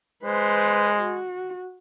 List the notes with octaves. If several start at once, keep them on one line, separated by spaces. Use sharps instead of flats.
G#3 B4 C5
F#4